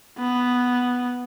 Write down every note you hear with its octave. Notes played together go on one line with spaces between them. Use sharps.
B3